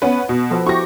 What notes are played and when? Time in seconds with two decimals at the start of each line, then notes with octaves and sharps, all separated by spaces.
0.02 B3 C#4 B4
0.29 B2
0.51 F3 B3 A4
0.67 E4 F#4 G4 C#6 A#6